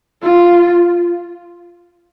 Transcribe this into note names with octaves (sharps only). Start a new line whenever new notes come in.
F4